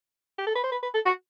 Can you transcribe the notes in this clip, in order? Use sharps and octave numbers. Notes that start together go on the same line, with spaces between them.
G4
A4
B4
C5
B4
B4
A4
F#4